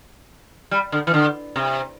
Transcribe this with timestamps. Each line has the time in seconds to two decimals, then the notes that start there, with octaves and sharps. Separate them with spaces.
0.71 G3
0.92 D3
1.07 E3
1.14 D3
1.56 C3